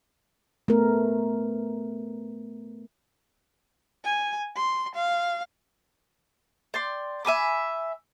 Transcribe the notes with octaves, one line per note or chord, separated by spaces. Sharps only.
A3 B3 A#4
G#5
C6
F5
D5 G5 C6
E5 G#5 B5 D6